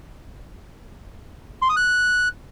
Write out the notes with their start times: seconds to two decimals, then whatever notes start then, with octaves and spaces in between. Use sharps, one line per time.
1.62 C6
1.69 D#6
1.77 F#6